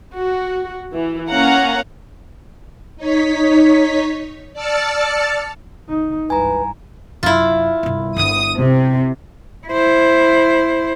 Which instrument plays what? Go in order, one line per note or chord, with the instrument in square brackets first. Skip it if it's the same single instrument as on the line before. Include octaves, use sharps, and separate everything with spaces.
[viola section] F#4
E3
A#3 C#4 F5 F#5 A#5
[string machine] D#4 C#5 B6
D5 A5 E6 F6 A6 C#7
[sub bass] G1 [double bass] D#4
[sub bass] C#2 [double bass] G2 E3 [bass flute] B4 [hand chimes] G#5 A#5
[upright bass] F#2 C3 [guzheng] E4 F4
[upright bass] G1 C2
[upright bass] G1 D3 [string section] D#6
[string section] C3
[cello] E4 C5